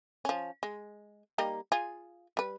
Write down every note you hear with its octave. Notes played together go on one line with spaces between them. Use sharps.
F3 C#4
G#3
G3 A#3 D#4
F4 G#4
G3 B4